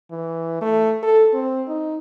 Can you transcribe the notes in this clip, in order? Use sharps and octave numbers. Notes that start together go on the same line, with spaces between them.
E3
A3
A4
C4
D#4